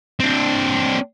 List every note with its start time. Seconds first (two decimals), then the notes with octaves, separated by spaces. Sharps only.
0.20 C4 D4